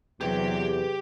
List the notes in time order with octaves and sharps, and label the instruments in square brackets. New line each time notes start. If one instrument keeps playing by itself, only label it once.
[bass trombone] E2 [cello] C3 F#3 [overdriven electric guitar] G4 G5 [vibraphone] G#4 B4